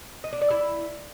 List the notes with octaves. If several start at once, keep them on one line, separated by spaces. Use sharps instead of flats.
D#5
D4
D5
E4